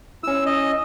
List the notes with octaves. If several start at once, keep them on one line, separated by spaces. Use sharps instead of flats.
C#4 E4 E6
D#5